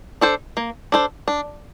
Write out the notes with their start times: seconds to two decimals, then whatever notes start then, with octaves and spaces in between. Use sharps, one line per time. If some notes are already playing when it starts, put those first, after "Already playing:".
0.21 D4 A4 C5
0.57 A#3
0.92 D4 A4 C5
1.28 D4